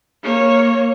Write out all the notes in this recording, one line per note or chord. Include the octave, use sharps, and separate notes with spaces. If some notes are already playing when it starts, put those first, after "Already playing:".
A#3 C#5